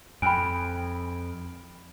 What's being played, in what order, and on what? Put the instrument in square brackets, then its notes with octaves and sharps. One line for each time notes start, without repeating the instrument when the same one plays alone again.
[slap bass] F2 [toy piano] G5 G#5 [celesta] B5 D7